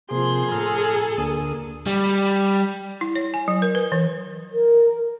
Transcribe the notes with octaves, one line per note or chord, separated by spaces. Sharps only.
C3 F3 A#3 G#4 C6
A2 A4 A#5 F6
D2 A#3 D#6
G3
E4
C#5
G#5
F#3
A#4
B4
E3
A#4